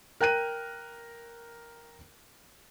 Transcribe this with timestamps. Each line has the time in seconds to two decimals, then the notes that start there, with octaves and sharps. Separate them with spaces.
0.21 A#4 G5 F#6 D#7